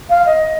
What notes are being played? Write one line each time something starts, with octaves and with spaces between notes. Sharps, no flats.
F5
D#5